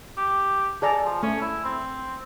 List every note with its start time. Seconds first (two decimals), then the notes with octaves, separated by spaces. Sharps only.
0.17 G4
0.82 G#4 A4 D5 A#5
1.05 F3
1.23 A3 C#4
1.41 E4
1.65 C4